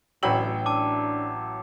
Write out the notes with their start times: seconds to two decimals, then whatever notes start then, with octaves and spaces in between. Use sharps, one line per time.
0.23 A1 D2 F#3 E5 G5 B5 F#7
0.66 D4 A5 D6